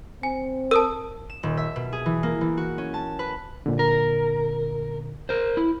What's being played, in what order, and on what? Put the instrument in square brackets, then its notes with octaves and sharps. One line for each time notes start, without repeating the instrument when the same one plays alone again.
[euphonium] C4 [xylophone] G#5
[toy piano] A#4 [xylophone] A5 D#6 E6
[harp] E7
D#1
E5
B2
G#4
E3
A#3
E3
F#4
C#4
A5
B4
[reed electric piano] A#2 D3
[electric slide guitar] A#4
A#4 C5
E4